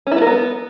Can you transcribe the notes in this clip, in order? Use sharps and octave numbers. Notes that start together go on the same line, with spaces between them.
C#4
E4
B3
A#4
B3